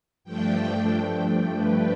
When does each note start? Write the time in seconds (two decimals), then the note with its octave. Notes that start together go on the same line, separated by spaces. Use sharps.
0.24 G2 F3 A3 D4 G5
1.52 B4